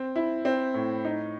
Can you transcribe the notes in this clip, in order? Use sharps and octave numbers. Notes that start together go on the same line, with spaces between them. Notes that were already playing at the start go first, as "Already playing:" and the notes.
Already playing: C4
E4
C4
A2
D#4